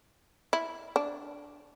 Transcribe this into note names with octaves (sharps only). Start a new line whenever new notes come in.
E4
D4